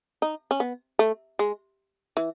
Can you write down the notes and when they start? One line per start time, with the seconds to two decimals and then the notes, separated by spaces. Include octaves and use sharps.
0.22 D#4
0.51 C#4
0.60 B3
0.99 A3
1.39 G#3
2.17 E3